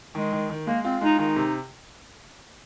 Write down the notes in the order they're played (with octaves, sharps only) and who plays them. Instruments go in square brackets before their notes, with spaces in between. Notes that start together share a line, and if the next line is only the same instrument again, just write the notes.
[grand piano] D#3 [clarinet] G#3
[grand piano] D#3
D#3
[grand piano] G#3 [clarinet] A#3
[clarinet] C4 [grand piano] F4
[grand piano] G#3 [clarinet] D#4
[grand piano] D#3 [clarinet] D#4
[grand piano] C3